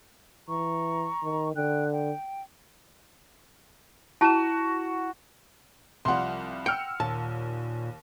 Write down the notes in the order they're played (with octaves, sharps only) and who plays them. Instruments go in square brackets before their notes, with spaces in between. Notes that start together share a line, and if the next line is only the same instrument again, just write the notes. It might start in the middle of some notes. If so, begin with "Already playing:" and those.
[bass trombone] E3 [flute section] A#5 C#6
[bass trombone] D#3
[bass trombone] D3 [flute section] G5 F#6
[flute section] G5
[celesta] E4 E7 [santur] F#4 [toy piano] A5
[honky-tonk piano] C2 F3 G3 [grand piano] F#5 C6
[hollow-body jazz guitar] G5 [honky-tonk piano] E6 F6 C#7
[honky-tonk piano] D#2 [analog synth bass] A#2 [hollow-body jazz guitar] A5